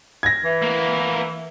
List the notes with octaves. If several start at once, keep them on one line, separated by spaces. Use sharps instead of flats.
G#6 A#6
E3
A#3 B3